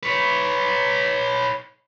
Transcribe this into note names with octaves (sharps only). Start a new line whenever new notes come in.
B4 C#5